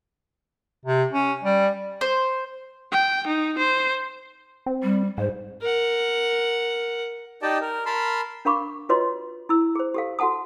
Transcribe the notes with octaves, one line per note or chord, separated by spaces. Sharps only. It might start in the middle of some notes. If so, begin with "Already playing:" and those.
C3
C#4
G3
C5
G5
D#4
C5
C4
G3
G#2 C5
A#4 F#5
D#4 G4 D5 D#5 G5 A5
A#4
A#4 A5 B5 C6
D4 A#4 F5 B5 C#6 D6
F4 F#4 B4 C#5 D#5 C6
E4 E6
G#4 C5
G4 A4 F5
F#4 A4 F#5 A5 D#6